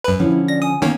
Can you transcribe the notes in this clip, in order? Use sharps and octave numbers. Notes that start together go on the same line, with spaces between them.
F#2 B4
D3 F3 C#4 E4
D5 A#6
G#5 D#6
D#3 A#3 B3 C#4